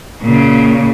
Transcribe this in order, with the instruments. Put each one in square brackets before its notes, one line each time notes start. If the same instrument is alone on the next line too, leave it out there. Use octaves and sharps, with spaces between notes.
[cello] A#2 C#3